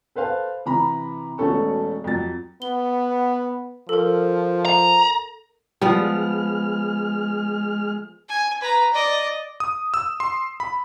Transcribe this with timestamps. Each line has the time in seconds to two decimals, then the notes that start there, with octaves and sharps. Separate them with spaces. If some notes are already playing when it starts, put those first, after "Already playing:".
0.15 A4 B4 C5 F5 A5
0.66 C3 E3 A#5 B5
1.38 E1 B2 A3 C#4 A4 C#6
2.04 F2 F#3 A6
2.62 B3 G7
3.89 F3 A4 A#4
4.65 A#5
5.82 F3 G3 G#3 B3 F6
8.29 G#5
8.61 B4 A#5
8.93 D5 D#5
9.60 D#6
9.94 E6
10.20 C6
10.60 B5